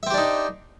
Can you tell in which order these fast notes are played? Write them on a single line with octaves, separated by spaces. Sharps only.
E5 C4 G4 D4 D#4